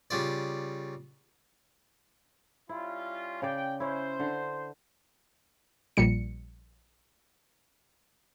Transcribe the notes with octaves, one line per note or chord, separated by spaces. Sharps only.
C#3 G3 F4 D5
G3 C#4 E4 F4
C#3 D5 G5
C#4 E4 C5
D3
A#1 A#2 G3 C#7